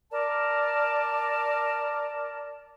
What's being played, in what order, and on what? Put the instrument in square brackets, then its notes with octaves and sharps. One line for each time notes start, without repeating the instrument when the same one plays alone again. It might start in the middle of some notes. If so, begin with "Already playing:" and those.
[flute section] A#4 D5 A5